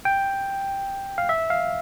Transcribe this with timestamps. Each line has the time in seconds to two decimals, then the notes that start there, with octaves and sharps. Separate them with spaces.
0.05 G5
1.18 F5
1.29 E5
1.50 F5